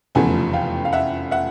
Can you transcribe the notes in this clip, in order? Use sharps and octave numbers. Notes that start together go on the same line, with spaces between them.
F1 E2 C#3 F3 A3 F#5 G#5
F5 G5
F5
E5 F#5
E5 F#5